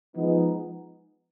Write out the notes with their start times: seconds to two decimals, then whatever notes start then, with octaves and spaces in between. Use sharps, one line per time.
0.14 F3 G#3 B3 D#4